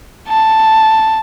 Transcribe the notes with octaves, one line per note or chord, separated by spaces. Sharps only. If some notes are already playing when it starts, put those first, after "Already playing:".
A5